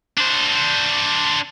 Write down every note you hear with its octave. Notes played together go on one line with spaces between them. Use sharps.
D4 C5